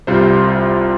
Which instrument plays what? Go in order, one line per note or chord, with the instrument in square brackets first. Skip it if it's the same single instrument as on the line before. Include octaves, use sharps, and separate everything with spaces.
[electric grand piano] C2 C3 G3 F4 C5